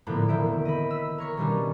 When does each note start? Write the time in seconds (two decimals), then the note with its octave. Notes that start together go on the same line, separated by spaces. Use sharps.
0.07 A2 D3 F3 A#3 B3
0.28 E1 D#3 C4 E5 D7
0.65 D#5 B5
0.90 E6 B6
1.18 A#4 C#5 C#6
1.37 B2 D#3 G3 B3 C#4 D4